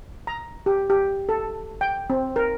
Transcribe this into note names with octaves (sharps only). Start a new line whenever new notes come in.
A#5
G4
G4
A4
G5
C4
A#4